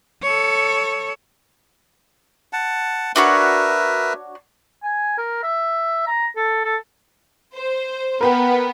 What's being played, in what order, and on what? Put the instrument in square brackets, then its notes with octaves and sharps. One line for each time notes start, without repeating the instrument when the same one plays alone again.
[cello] A4 C#5
[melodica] F#5 A5
[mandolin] D4 F#4 C#5 [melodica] A#4 B4 E5
[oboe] G#5
A#4
E5
A#5
A4
A4
[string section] C5
[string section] B3 [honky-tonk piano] A#4 B4 G5